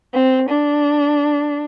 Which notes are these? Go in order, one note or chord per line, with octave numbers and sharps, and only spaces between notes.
C4
D4